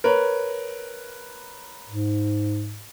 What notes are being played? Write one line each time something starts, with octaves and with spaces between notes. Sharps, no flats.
A#4 B4 C#5
G#2